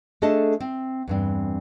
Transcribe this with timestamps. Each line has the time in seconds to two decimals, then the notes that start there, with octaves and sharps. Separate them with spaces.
0.22 A3 D4 G#4 A4 D#5 A5
0.61 C4
1.08 E2 G2 C4